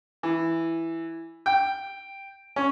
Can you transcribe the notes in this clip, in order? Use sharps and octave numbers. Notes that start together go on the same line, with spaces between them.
E3
G5
C#4